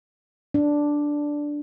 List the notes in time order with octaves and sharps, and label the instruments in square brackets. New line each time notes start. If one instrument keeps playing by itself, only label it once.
[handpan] D4